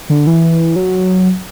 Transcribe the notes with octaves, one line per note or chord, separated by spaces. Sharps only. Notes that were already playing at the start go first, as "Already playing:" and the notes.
D3
E3
F#3